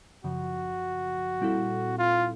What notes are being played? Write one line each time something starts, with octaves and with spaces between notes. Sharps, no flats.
F#2 C#3 F3 F#4
A#2 G3 C4 E4 A4
F4